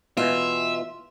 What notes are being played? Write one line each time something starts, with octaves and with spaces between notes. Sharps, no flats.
B2 E3 F4 E5